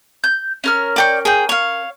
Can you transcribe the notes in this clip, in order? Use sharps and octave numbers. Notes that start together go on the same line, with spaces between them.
G6
C#4 A#4 F6
D5 G5 C#6
G#4 G5
C#5 F5